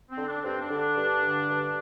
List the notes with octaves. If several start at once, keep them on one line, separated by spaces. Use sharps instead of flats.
C4
D3
D4
G2 C4
D4
D3
D4
G2
D3
G2